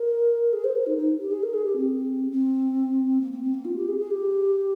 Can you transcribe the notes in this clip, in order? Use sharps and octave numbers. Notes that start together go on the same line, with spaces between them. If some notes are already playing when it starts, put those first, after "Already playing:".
Already playing: A#4
G#4
C5
A#4
D#4
D#4
G4
G#4
A#4
G#4
G4
C4
C4
A#3
A#3
C4
A#3
F4
G4
G#4
G#4
G4